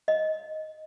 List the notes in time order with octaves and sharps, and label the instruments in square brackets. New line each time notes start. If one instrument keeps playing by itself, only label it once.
[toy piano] D#5